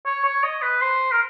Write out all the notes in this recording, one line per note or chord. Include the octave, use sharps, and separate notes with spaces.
C#5
C#5
D#5
B4
C5
A#4